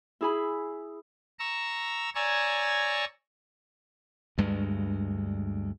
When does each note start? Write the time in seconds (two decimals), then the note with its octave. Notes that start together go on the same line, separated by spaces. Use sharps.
0.21 E4 G#4 B5
1.39 A#5 C#6 E6
2.15 C#5 D5 G#5 A#5 C#6 E6
4.38 D2 G2 G#3